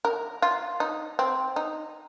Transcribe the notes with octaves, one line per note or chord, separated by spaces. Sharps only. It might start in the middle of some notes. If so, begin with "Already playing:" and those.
A#4
F4
D#4
C4
D#4